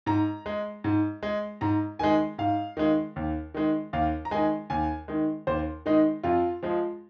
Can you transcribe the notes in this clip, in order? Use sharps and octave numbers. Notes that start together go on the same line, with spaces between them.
G#2 A#5
G#3
G#2
G#3
G#2 A#5
D#3 G#3 G#5
G#2 F5
D#3 G#3
D#2
D#3 G#3
D#2 F5
A#5
D#3 G#3 G#5
D#2 G#5
D#3 G#3
D#2 C5
D#3 G#3 D#4
F2 F4
F3 G#3